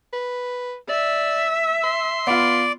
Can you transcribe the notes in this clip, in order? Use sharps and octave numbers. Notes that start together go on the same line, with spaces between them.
B4
D5 E5
C6
B3 F4 D5